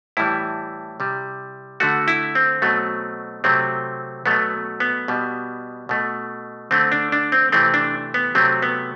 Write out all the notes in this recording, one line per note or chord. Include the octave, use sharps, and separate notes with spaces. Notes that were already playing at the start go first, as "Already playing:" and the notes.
A2 E3 G3 E4
C3 G3
D3 A3 F#4
E4
C4
B2 F#3 A3
C3 F#3 A3 C4
B2 F#3 A3 B3
B3
B2 G3
B2 A3
D3 A3 C4
D4
D4
C4
C3 E3 A3 C4
D4
B3
C3 F#3 A3 C4
B3